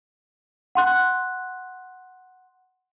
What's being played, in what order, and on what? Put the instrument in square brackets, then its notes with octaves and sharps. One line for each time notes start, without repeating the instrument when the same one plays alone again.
[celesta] F#5 C6 F#6